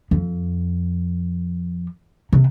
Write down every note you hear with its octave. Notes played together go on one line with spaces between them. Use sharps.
F2
C3